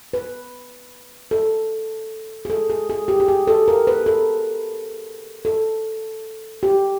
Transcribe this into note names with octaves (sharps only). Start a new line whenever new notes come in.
B4
A4
G#4
A4
G#4
G#4
G4
G4
G#4
A4
A#4
B4
A4
A4
G4